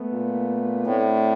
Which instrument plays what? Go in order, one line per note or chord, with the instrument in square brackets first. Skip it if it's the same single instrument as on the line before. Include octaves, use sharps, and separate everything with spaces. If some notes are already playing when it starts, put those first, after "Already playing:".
Already playing: [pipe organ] A3 B3
[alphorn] A#2
[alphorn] A2 [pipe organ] C4 D4